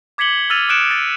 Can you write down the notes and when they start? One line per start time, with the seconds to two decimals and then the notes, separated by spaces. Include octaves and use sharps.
0.18 D6 G#6 B6 C#7 F#7 G7
0.50 E6 F6 G#6 A6 D#7 F7
0.69 D#6 F#6 C#7 D7 E7
0.91 A6